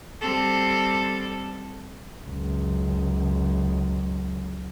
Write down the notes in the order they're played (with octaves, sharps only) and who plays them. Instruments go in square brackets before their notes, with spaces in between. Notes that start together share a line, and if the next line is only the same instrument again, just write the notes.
[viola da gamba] G3 C4 A4
[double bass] C#2 F#2